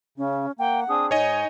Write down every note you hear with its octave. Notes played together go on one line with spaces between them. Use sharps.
C#3 C#4
A#3 F#5 G5
C4 D4 G#4 D#6
G#2 D#4 C#5 D#5 G#5